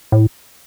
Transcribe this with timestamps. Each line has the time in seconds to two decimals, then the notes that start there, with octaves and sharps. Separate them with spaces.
0.12 A2